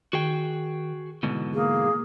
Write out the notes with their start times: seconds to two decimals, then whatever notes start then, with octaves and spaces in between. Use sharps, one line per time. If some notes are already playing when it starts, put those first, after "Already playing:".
0.13 D#3 F#4 G#4 G5
1.23 G#2 B2 D3 E3
1.54 A#3 G#4